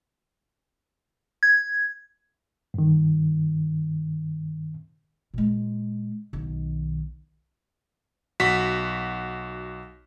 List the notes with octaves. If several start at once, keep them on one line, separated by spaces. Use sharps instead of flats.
G#6
G2 D#3
A#2 G#3
B1 D#3
B1 F#4 B6